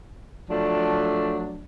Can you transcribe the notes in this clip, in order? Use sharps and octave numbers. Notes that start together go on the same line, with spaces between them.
F3 F#3 A3 D4